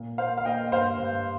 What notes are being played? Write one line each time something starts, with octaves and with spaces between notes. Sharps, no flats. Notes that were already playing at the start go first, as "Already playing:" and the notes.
Already playing: A#2
A#3 C5 F5
F5
A#3 D#5 G5
G2 C5 F5
G2